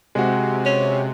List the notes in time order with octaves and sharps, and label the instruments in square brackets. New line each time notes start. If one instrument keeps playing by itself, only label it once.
[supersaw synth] C3 [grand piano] G#3 F#4
[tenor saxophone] C#4